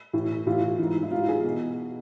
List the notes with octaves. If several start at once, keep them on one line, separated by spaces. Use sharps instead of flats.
A2 E3
A2 E3 F4
G#2 E3
E4
G#2 E3 F4
G#4
B2